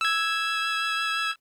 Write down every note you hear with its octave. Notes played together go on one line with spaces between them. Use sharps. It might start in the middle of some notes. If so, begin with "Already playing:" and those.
E6 G#6